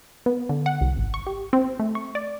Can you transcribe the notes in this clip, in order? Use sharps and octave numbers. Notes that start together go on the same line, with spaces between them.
B3
D3
F#5
C2
G#1
C#6
G4
C4
A3
C#6
D5